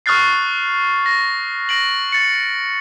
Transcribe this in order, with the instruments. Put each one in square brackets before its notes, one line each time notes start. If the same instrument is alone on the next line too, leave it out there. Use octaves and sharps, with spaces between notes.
[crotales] C#6 D#6 F6 F#6 A6 C7
A#6
A#6 D7 F#7
A6 C#7